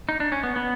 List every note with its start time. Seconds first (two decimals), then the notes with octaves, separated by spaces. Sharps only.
0.09 D#4
0.20 D4
0.32 C#4
0.43 B3
0.56 B3